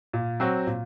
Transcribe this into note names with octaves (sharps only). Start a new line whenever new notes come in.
A#2
F#3 C4 F#4
A#2